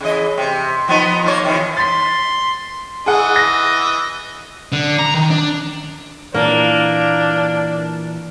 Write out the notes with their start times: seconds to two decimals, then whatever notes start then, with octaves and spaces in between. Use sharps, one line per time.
0.01 C#3 E3 D#5
0.38 C3
0.88 F3 B3 D#4
1.24 F3 A#3 C#5
1.44 C3 D#3 E3
1.77 C6 A6 B6
3.06 E3 G#4 D#5 F#5
3.36 A#6
4.72 D3
4.99 A#5
5.14 D#3
5.30 D4
6.34 A#2 E3 A#3 D4